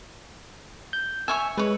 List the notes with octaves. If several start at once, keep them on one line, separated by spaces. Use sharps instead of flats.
G6
C#5 E5 G#5 E6
G#3 B4 C#5